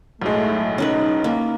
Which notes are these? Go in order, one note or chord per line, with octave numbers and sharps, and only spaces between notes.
B1 A2 G#3 A3
C#4 D#4 A#4 B4
A#3